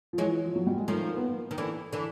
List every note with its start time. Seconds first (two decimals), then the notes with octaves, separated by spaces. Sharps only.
0.13 F3
0.17 E3 F#3 G#3
0.46 F3
0.56 F#3
0.67 G3
0.77 G#3
0.88 D#3 F3 A3
1.16 B3
1.23 A#3
1.51 D#3
1.58 D3 E3
1.93 D3 E3